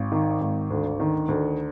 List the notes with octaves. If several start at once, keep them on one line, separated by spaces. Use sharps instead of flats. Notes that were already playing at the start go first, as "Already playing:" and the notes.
Already playing: G#1
D#3
G#1
D2
D#3
D2